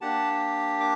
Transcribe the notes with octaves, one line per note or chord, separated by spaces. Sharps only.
A#3 D4 G4 F#5 A5
D6